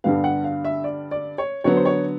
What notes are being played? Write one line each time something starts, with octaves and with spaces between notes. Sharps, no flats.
G2 D3 G3 B3 F5
F#5
F5
E5
D5
D5
C#5
D3 F#3 B3 C#5
C5
C#5